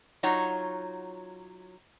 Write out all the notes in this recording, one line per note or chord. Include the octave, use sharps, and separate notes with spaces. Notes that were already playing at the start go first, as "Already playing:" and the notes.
F#3 D#4 F4 C#5 F#5